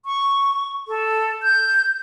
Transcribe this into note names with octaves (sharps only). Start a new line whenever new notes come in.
C#6
A4
G6